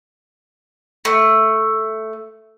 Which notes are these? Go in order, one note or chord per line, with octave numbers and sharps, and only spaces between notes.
A3